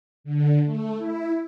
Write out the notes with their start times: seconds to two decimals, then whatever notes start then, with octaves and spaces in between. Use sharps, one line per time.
0.24 D3
0.65 A3
0.98 E4